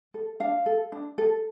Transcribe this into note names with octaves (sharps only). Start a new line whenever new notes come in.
A4
D4 F5
A4
D4
A4